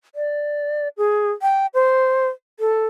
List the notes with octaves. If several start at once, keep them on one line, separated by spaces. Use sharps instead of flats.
D5
G#4
G5
C5
A4